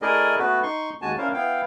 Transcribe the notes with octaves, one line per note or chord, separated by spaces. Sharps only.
A3 E4 G#4 A#4 D5 D#5
A3 B3 F#4 B4
D#4 C6 C#6
D#2 G#3 F#4 G#5 A5
C#4 D4 E4 A#4 C5 F5
B3 E4 F5 G5